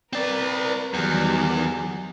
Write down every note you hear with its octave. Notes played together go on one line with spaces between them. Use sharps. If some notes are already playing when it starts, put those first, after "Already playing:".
C4 A#4 B4 D5
E2 D#3 F#3 G3